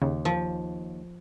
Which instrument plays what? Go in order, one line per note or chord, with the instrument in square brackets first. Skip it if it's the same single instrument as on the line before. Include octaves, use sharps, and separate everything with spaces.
[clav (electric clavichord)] D#2 [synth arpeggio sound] C#3
[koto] F3